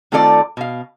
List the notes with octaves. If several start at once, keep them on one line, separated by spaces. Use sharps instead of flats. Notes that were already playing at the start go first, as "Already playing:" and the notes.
D#3 A3 C4 F4 A4 D5
B2 F5